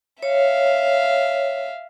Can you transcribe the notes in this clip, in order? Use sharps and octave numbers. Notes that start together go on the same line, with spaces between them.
C#5 E5 F5